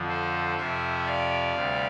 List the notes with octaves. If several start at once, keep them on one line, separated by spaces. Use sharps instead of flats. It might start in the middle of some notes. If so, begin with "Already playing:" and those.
Already playing: F2 D3 F3
A4 C5
F2 C3 F3 C5 E5
D5 F5
D2 C3 G3